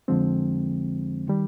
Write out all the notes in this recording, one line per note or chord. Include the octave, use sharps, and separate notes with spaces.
F2 D3 F3 G#3 C4
D#3 G3